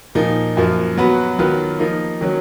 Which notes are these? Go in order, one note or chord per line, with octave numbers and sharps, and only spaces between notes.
A#2 F3 A#3 D#4
F#2 F3 A#3
F#3 B3 F#4 B4
D#3 F#3 B3 F4 B4
F3 A#3 D#4
D#3 F#3 C#4